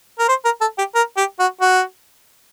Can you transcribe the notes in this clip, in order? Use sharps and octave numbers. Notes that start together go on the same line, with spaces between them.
A#4
C5
A#4
A4
G4
A#4
G4
F#4
F#4